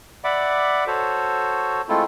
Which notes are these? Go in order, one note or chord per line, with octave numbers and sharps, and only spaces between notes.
D5 E5 F#5 B5 D6
F#4 A4 C5 C#5
G#3 A3 C4 E4 F4 A4